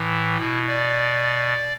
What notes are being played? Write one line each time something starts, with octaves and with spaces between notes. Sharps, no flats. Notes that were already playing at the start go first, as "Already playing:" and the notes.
Already playing: A2 E3
B2 E4
D5